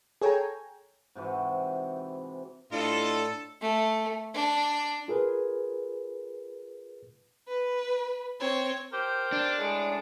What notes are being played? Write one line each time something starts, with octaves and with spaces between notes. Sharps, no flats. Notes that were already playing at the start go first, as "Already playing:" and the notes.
G#4 A4 C#5 G5 G#5 A#5
G#2 C3 E3 F#4
A2 D4 F4 A4 D#5
A3
D4
F4 G#4 A#4 B4
B4
C4 C#5
G4 A#4 C5
D4
A2 G#3